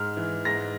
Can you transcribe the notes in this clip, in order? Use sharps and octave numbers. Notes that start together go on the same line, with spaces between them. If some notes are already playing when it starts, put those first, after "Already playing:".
Already playing: G#2 F6
E3
G#2 A#6